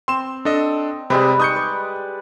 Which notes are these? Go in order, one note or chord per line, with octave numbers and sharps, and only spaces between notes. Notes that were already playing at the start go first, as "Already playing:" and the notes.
C4 C6 E7
D4 A4 D#5
C3 G3 G#3 C4 B4
D#4 C#6 D#6 G6 C#7
D5